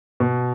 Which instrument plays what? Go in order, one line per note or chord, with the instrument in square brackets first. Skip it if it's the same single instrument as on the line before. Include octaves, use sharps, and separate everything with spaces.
[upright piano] B2